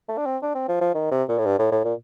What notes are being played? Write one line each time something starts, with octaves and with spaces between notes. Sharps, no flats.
A3
D4
C4
D4
C4
F3
F3
D#3
C3
A#2
A2
G2
A2
A2
A#2